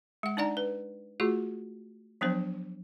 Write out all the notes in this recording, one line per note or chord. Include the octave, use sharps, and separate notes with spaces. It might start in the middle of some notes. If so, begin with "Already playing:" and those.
G#3 F#5
D4 D#4 D5 F#5 A#5
B4
A3 F4 F#4 G#4
F3 F#3 B3 D4 C5